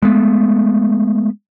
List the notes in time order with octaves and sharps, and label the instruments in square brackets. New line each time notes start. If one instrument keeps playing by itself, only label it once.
[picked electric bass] G#3 A3 B3